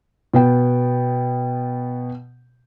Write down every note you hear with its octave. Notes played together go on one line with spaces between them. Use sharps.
B2 B3 G5